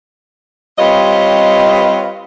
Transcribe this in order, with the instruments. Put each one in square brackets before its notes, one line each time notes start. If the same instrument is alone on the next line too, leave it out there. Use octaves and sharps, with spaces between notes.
[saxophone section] G3 C4 F4 B4 C#5 D#5